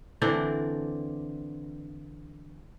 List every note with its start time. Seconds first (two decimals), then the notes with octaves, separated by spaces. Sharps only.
0.22 D3 E3 C4 D4